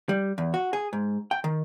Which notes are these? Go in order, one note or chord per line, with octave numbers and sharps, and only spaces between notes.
G3
E2
F#4
G#4
G#2
G5
D#3